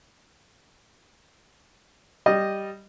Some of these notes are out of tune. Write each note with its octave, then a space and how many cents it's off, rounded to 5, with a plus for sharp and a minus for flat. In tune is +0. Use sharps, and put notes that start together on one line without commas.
G3 +0 D#5 -5